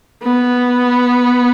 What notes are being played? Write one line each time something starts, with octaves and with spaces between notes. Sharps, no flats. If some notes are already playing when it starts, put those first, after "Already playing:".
B3